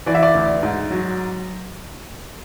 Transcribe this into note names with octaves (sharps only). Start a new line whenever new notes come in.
E3 D5
E5
D5
D2
G#2
F#3